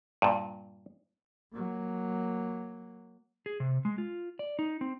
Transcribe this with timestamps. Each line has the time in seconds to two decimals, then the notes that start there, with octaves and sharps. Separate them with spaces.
0.22 G2 A#2
1.53 F#3 A#3
3.46 G#4
3.60 C3
3.85 G#3
3.98 F4
4.39 D5
4.59 D#4
4.81 C4